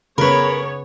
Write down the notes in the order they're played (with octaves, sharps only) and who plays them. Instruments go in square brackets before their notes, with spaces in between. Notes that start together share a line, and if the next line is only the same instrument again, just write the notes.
[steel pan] C#3 [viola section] B3 C#5 [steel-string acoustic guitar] A#4 B4 [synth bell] B5